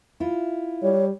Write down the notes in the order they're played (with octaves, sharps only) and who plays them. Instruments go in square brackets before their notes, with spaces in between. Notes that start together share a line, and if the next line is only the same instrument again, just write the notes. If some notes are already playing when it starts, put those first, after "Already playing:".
[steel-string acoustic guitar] E4 F4
[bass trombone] G3 [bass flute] C#5